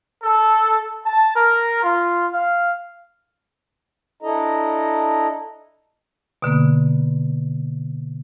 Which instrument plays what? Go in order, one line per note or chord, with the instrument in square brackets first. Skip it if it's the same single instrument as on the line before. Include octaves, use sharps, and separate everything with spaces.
[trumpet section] A4
A5
A#4
F4
F5
[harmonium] D4 E4 A4 D#5 A#5
[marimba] B2 D3 A#3 B3